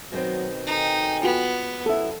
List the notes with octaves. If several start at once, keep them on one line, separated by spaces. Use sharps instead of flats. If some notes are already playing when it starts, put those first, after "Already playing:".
B2 D#3 F#3 C4
D#4 A4 G5 G#5
B3 F4 F#4
C#2
C2 F#2 B3 E4 A4